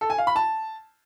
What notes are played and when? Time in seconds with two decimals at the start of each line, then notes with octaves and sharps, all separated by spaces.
0.01 A4
0.10 G#5
0.18 F5
0.27 B5
0.36 A5